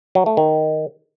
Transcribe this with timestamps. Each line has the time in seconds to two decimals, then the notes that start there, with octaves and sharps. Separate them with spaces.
0.15 F#3
0.26 A3
0.37 D#3